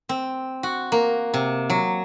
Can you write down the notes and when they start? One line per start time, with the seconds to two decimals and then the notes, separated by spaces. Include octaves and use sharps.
0.09 C4
0.63 F#4
0.92 A#3
1.34 C3
1.70 F#3